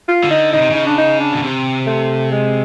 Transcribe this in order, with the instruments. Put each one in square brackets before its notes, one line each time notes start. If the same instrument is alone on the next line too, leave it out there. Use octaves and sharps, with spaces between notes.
[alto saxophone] F4
[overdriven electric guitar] D3
[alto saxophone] D#4
[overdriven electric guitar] C#3 [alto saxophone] D#4
[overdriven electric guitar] C3
[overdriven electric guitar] C#3 [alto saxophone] D#4
[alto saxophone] D4
D#4
D4
[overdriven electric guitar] B2
C3
[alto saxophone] A3
G#3